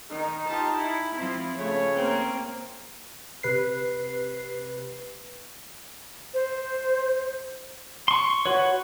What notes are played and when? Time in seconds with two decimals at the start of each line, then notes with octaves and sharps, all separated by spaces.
0.10 D#3 D#4
0.47 F4 G4 A5
0.76 E4
1.15 F3 C4 E4
1.58 C#3 A3 C#5
1.96 A#3 C4
3.43 C3 B4 C7
6.34 C5
8.08 C6 C#6
8.46 F#4 B4 C#5